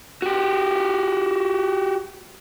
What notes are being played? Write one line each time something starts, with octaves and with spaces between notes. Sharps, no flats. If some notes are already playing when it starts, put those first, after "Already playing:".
F#4 G4